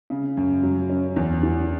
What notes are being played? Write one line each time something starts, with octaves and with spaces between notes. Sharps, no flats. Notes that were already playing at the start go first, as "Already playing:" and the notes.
C#3
F#2
F#3
C#4
E2
E3